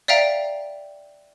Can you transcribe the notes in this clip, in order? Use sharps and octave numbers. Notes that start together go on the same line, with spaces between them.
D5 E5 F5 G5 A#5